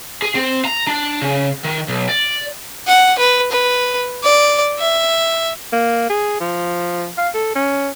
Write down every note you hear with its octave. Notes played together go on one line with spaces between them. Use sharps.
G#4
C4
A#5
D4
C#3
D#3
B1
D5
F#5
B4
B4
D5
E5
A#3
G#4
F3
F5
A4
C#4